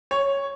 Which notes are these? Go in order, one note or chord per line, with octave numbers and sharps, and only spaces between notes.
C#5